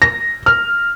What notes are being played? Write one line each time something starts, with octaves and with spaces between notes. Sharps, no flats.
A#6
F6